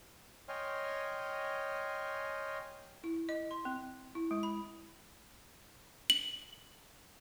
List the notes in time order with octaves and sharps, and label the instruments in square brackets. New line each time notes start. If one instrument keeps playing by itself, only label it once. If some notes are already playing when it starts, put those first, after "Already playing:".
[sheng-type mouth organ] C#5 D#5 G5 G#5 C6 F6
[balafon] E4
D#5
C6
C4
E4
G#3
B5
[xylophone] F#7